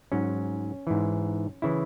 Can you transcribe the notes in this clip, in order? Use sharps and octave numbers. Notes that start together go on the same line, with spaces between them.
G#2 F#3 C#4
G#2 E3
C#3 E3 E4